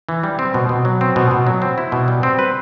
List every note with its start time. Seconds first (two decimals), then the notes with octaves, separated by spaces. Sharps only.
0.09 E3
0.23 G3
0.39 C4
0.54 B2
0.69 B2
0.85 F#3
1.01 C4
1.16 B2
1.31 B2
1.47 F#3
1.62 C4
1.78 E4
1.92 B2
2.08 G3
2.23 C4
2.39 B4